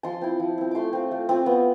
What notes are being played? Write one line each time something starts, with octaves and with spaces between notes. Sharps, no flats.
F3 A5 C6
C4 E4
F3
C4 E4
A3 A5 C6 D6
C4 F4
A3
C4 F4
B3